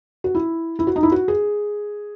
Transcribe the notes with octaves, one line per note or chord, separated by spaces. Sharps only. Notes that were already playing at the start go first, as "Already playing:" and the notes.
F#4
E4
E4
F#4
D#4
E4
F#4
G#4